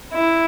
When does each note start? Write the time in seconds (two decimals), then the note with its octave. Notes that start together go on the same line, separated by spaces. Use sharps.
0.13 E4